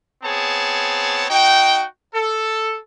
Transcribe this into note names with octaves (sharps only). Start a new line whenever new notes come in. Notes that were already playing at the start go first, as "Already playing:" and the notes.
B3 C4 G#4 C#5 A5
D#4 F#4 G5
A4